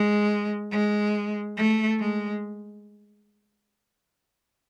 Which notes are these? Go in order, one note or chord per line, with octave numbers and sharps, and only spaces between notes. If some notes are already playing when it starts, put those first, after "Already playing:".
Already playing: G#3
G#3
A3
G#3